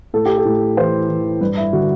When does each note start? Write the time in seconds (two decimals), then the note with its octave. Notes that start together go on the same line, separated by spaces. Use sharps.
0.14 A2 A4
0.25 G4
0.38 A4
0.45 A2
0.77 E3 C5
1.09 E3
1.41 G2 B4
1.57 E4
1.73 D3 F#4